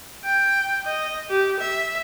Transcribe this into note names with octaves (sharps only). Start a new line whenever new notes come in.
G5
D#5
G4
E5